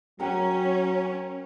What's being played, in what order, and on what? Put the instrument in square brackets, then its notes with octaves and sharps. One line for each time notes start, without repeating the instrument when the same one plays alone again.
[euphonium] F#3 [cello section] C#4 [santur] A#4 F#5 G5